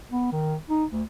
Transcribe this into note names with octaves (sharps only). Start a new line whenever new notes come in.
B3
D#3
D#4
D2